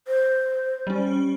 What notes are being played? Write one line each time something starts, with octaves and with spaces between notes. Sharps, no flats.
C5
G3 C#4